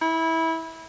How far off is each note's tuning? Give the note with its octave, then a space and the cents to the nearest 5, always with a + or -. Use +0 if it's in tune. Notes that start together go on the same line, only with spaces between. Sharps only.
E4 -20